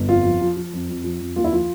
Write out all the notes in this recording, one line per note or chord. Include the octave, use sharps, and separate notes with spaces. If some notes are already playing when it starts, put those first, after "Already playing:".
Already playing: G1
F2 F4
F3
F3
F3
F2
F2
F3
F2
D#2 F4
E4
F3 F4